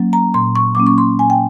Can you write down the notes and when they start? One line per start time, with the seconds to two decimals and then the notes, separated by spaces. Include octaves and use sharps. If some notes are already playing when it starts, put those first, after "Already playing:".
Already playing: F#3 A#3 C#4
0.13 A#5
0.34 A#2 C6
0.56 C#6
0.75 F#3 A#3 C#4 D6
0.87 C#6
0.98 C6
1.19 A#2 G#5
1.30 G5